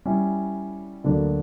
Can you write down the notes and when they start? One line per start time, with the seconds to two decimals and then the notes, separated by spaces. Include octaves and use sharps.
0.05 G3 C#4 E4
1.04 D2 D3 F#3 A#3 D4